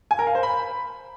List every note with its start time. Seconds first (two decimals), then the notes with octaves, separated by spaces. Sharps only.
0.11 G#5
0.19 A#4
0.27 F5
0.35 C5
0.43 B5